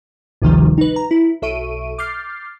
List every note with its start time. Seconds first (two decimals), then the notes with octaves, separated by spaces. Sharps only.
0.42 G#1 D2 C3 D#3 F3 G3
0.78 D#4 B4
0.96 A#5
1.11 E4
1.42 B1 A4 E5 C#6 D7 D#7
1.98 D6 F6 G6 A6 C7